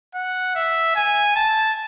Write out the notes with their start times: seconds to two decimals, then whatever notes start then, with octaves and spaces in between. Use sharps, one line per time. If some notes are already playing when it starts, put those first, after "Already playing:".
0.14 F#5
0.55 E5
0.96 G#5
1.36 A5